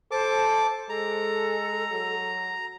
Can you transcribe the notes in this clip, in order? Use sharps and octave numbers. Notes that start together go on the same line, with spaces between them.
A4 C5 A5 D6
G#3 A4 A#5
F#3